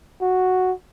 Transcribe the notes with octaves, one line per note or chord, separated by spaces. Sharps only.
F#4